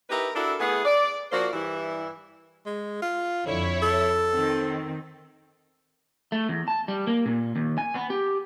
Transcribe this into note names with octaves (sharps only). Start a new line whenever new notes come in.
D#4 E4 G4 A#4 B4
D4 E4 F#4 A4 A#4
A3 B3 E4 G#4
D5
F3 A#3 F4 F#4 C5 D5
G2 E3 G3 E4
G#3
F4
F2 D3 E4 C#5
A4
D#3 C4
A3
E2
A5
G3
A#3
A#2
D#2
G#5
B3
G4